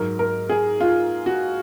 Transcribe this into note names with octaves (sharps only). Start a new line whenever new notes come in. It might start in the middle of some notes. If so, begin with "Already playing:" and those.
Already playing: G#2 F#3 A#4
A#4
G#4
F4
F#4